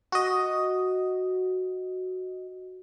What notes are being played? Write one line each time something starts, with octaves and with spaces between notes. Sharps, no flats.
F#4 D#5